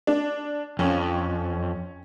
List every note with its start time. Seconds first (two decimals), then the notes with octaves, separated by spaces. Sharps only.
0.07 D4
0.79 F2 C#4